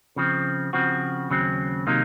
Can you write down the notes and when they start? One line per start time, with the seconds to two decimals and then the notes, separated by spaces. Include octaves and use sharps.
0.16 C#3 F3 C4
0.73 C#3 F3 C4 F#4
1.30 D#2 C#3 F#3 C4
1.87 C3 D#3 F#3 A#3 D#4